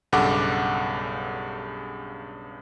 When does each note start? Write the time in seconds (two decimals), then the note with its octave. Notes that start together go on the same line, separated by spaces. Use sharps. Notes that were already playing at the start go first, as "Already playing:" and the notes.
0.12 B1 G2 C#3 A4 F#5 D6